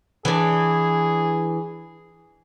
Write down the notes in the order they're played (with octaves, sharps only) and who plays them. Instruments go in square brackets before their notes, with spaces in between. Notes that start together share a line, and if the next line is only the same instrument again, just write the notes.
[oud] E3 D4 [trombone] G#4